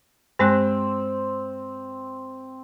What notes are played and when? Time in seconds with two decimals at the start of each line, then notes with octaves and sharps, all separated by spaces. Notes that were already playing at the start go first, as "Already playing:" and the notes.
0.39 G2 G#3 C4 F#6